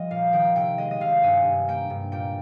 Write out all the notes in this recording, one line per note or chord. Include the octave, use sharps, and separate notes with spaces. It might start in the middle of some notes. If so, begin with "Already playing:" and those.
Already playing: F3 G3 D#5 G5
A#2 F5
D#3 G5
C3 G5
G#3 D#5
D#5
C3 F5
G2 G#5
G2
A#3 G5
G2
A#2 G5